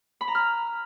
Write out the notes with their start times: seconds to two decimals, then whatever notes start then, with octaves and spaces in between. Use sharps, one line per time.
0.21 B5
0.28 A#5
0.35 F6